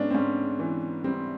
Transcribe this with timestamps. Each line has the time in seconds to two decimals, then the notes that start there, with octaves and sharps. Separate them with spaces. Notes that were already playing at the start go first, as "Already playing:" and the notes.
Already playing: G#2 B3 C#4 D4
0.10 C4
0.14 G#2 C#4
0.59 E3
1.04 G3 C4